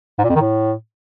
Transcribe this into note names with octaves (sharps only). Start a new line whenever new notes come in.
G#2
A#2
F2
D#3
A2